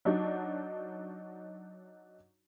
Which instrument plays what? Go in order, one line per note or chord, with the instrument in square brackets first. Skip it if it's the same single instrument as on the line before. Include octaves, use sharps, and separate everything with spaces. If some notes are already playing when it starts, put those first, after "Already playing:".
[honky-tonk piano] F#3 D4 D#4 F#4